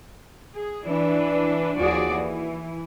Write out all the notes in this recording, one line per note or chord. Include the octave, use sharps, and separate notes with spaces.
G#4
E3 D4 B4
D#2 F3 F#4 G#4 D5
E3